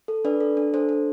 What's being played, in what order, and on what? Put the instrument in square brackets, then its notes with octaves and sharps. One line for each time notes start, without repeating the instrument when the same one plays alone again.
[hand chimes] A4
D4 B4 D5
A4
D4
D4 A4 C5
D4